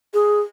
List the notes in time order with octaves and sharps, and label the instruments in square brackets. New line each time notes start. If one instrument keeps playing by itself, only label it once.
[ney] G#4